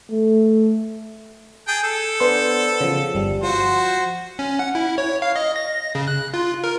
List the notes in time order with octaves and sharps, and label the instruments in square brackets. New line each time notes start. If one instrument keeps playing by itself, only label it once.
[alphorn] A3
[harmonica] G#4 G5 A5
A4
[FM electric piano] B3 D4 C5
C#3 F3
G1 G3
[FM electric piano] F3 [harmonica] F#4 C5
[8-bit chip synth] C#4
F#5
E4
C#5
F5
D#5
A#6
C#3
F#6
F4
A#4